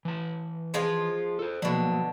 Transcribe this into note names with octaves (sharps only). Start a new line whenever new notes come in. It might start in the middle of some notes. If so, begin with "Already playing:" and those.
E3 A5
F3 G#3 F4
A4 C5
B2 D3 F3 F#3 A#3